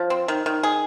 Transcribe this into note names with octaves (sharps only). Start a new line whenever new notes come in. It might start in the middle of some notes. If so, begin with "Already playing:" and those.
Already playing: F3
C4
D#3
D#3
G#4